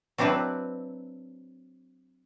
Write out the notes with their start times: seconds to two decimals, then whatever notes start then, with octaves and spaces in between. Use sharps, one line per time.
0.18 F#3 C4 D4 E4 B4